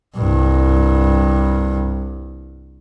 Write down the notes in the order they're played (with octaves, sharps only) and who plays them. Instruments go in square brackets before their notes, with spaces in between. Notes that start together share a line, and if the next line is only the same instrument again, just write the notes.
[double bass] C2 G2